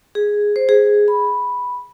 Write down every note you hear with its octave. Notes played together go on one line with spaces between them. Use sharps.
G#4
C5
G#4
B5